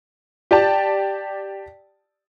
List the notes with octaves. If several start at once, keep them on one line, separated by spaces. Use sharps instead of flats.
G4 D5 A5